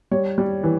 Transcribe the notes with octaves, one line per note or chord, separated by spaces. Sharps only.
G3 C#5
G3
E3